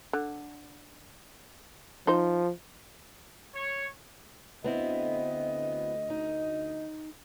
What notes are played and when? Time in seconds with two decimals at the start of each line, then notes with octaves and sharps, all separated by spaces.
0.13 D3
2.07 F3 D#4 C5
3.55 C#5
4.64 D2 B3 C4 E4 D#5
6.10 D#4